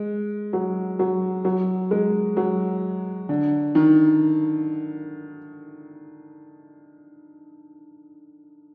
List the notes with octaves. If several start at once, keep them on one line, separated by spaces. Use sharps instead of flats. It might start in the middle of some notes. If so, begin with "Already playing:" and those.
Already playing: G#3
F#3
F#3
F#3
G#3
F#3
D3
D#3